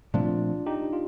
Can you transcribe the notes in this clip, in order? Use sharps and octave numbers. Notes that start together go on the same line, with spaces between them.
A#2 F3 A3 C4 D4 F4
D#4 G4
F4